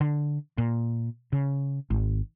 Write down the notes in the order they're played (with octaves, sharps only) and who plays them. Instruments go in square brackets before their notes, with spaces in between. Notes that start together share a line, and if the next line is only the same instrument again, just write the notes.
[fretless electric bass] D3
A#2
C#3
G#1